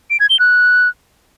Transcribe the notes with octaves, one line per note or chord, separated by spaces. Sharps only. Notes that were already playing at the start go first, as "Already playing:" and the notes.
D7
G#6
G7
F#6